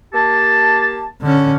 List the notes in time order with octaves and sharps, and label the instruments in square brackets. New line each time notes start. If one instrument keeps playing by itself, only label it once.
[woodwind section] A#3 G4 A5
[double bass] D3 C#4